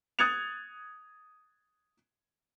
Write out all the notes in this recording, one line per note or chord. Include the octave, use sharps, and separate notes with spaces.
D#6 F#6 G#6 A6 C#7 F7